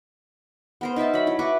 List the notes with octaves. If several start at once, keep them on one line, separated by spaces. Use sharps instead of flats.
B3 A#4 C5
D#4 A#4 E5 A5
F#3 B5
E4
F#4 B4 C#6 D6